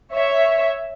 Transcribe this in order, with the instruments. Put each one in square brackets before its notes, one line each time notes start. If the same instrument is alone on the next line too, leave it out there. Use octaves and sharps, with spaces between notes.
[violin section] C#5 E5